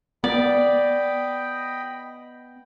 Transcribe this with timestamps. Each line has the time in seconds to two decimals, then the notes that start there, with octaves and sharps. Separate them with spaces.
0.24 B3 D5 D#5 G5 B5